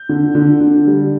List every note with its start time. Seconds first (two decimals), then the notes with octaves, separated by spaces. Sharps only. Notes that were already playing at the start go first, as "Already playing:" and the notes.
Already playing: G6
0.09 D3
0.35 D3
0.61 D3
0.87 G3